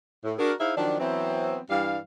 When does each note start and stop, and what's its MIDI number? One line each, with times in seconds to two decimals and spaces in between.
0.24 0.35 45
0.38 0.53 62
0.38 0.53 66
0.38 0.53 68
0.38 0.53 70
0.60 0.74 63
0.60 0.74 64
0.60 0.74 68
0.60 0.74 72
0.60 0.74 76
0.60 0.74 77
0.77 0.99 51
0.77 0.99 53
0.77 0.99 54
0.77 0.99 62
0.99 1.59 52
0.99 1.59 54
0.99 1.59 59
0.99 1.59 60
1.70 1.98 43
1.70 1.98 52
1.70 1.98 55
1.70 1.98 77